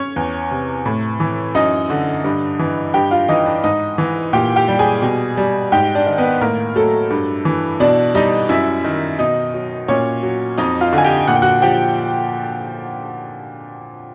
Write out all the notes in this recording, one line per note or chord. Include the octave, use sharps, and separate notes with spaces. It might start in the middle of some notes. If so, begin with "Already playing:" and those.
Already playing: C#4 C#5
E2
C3
A2
E3
F#2 D#4 D#5
D3
G2
E3
G2 G4 G5
F4 F5
E3 D#4 D#5
D4 D5
G#2 D#4 D#5
E3
A#2 G4 G5
G4 G5
G3
G#4 G#5
B2
G3
G#2 G4 G5
D4 D5
D#3
B3 B4
A2 A#3 A#4
F#3 A3 A4
G2
E3
B2 D4 D5
G3 D#4 D#5
F#2 E4 E5
D#3
B2 D#4 D#5
F#3
A#2 C#4 C#5
F#3
F2 D#4 D#5
F4 F5
D3
G#5
G4 G5
A#2 F#5
G5
F#4 F#5
F3 G4 G5